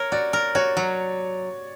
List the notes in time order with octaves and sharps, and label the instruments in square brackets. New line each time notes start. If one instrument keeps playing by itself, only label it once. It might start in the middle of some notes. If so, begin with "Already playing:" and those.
Already playing: [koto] A#4 [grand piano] C#5
[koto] F#4 [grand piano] D5
[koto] A#4
[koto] F#4 [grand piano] C#5
[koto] F#3